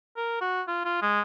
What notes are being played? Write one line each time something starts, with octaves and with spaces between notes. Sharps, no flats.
A#4
F#4
F4
F4
G#3